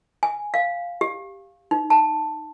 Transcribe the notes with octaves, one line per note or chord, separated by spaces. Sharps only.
G#5
F5
G4
D#4
A5